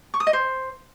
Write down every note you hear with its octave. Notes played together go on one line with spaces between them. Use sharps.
C#6
D#6
D#5
C5